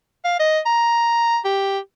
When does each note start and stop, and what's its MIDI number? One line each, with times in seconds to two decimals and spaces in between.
0.24 0.37 77
0.40 0.59 75
0.66 1.38 82
1.45 1.79 67